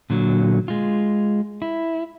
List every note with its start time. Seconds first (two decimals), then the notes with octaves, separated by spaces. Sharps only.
0.10 A#2 D3 F#3
0.68 G#3 F4
1.62 E4